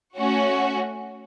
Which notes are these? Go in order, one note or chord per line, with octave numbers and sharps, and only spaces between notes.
A3 C#4 F#4